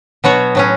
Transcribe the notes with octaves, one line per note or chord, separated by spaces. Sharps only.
B2 F#3 B3 F#4 C#5
A2 F#3 C#4